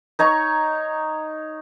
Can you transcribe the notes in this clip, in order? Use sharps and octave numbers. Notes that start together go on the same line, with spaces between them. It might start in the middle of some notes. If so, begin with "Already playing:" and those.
D#4 C#5 A#5 C#6